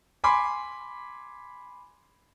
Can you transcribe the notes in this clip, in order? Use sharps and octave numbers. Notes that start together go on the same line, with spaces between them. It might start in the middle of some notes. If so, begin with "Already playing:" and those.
G#5 B5 C6 D6